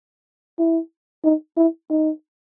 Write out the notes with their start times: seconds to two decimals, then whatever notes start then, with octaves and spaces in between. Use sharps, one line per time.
0.59 E4
1.24 D#4
1.57 E4
1.90 D#4